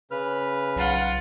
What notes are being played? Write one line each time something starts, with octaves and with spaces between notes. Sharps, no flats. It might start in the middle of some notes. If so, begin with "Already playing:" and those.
C#3 B4 F6
B1 F4 F#5